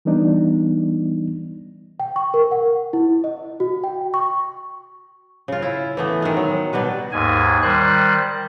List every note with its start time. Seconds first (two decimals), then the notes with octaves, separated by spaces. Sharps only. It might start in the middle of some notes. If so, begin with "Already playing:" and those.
0.05 E3 G3 B3 D4 D#4
2.00 G5
2.16 C#6
2.34 A#4
2.51 F#5
2.93 E4
3.24 D#5
3.60 F#4
3.84 G5
4.14 C#6
5.48 C#3 F4
5.62 E4
5.97 E3 A3 B3
6.22 D#3 G#3
6.37 F#3
6.73 B2 G3 F#4 B4
7.12 D#2 G#2 G#5
7.62 D#3 G3 C5 F#6